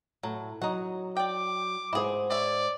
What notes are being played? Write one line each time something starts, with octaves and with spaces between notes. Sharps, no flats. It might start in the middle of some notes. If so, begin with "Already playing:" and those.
A2 F#3
F#3 D#4 F#5
D5 G5 D6
G#2 E4 G#4 C5
C#5 D5 E5